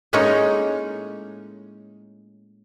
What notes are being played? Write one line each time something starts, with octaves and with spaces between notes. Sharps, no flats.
A2 G#3 A#3 C#4 D#4 C#5